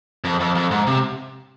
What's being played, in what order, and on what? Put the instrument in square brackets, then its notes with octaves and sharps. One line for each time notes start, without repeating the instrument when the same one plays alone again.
[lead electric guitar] F2
F2
F2
G#2
C3